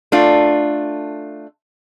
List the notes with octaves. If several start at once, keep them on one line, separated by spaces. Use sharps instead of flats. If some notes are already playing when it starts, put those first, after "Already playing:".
A3 D4 F4